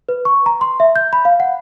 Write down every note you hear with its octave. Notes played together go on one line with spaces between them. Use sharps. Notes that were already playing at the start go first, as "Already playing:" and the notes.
B4
C#6
A#5
C6
E5
G6
B5
F5
F#5